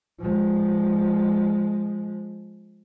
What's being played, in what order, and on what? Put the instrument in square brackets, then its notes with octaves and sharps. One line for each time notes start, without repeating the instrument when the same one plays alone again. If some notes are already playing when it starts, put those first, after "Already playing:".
[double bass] F3 G#3